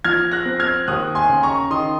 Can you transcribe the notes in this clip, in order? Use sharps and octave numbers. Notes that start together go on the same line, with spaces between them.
F3 F6 G#6
F#6 A#6
C4
F6 G#6
D#2 D#6 F#6
G#5 C6
C#3
A#5 C#6
D#3 C6 D#6